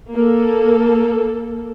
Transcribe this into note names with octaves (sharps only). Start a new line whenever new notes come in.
A#3 A4